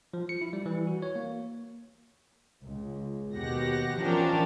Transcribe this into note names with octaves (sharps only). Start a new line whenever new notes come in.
F3
C#7
E4
G3
E3
F#4
C#5
A#3
C#2
D#2 B2 G4 F#5 A#6
E3 F3 C#4 D4 G4 A#4